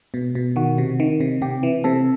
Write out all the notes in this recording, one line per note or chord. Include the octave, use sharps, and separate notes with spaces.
B2
B2
D#3 F#4
C3
D#3
C3
C3 G4
E3
C3 A4